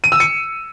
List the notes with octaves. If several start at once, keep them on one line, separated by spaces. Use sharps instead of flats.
D#7
E6
C#7